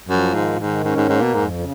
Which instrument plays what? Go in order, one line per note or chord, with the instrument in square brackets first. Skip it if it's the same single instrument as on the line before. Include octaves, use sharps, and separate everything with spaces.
[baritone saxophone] F#2 [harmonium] F3
[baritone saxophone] G#2 [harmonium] D#3
[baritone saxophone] G#2 [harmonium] D#3
[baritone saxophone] G#2 [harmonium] C#4
[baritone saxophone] G#2
[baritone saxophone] G#2 [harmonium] A#3
[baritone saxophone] B2
[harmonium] F2 [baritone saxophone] G#2
[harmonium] C#3